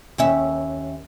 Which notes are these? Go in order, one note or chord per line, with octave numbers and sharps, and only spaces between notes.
D#2 C#4 E5